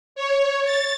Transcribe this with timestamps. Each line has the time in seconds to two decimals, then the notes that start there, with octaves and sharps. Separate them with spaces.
0.16 C#5
0.65 A6